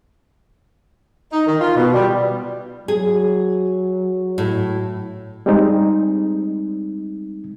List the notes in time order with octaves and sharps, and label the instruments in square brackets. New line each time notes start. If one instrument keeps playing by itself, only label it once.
[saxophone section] D#4
D#3
F4
B2
G3
[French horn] F#3 [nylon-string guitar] G#4
[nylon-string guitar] A2
[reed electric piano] G3 G#3 C4 D#4